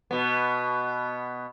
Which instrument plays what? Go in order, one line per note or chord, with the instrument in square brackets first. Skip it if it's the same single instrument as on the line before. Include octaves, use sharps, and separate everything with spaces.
[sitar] B2 B3